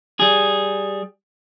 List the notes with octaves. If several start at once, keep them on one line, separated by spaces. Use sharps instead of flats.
G3 G#4